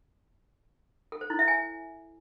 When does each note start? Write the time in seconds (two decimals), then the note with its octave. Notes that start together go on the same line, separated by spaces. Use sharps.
1.12 A4
1.21 C5
1.30 E4
1.39 E5
1.48 G#5